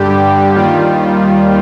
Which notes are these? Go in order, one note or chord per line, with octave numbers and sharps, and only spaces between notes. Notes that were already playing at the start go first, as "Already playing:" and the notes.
Already playing: G2 D3 G3 G4
D#2 D#3 G3 F4